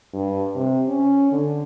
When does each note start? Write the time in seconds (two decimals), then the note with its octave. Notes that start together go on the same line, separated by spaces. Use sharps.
0.14 G2
0.55 C3
0.88 C#4
1.32 D3